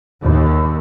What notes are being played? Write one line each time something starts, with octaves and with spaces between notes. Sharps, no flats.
D#2